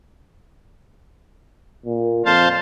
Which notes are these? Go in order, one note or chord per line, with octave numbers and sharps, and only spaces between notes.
A#2
F2 C5 F5 A5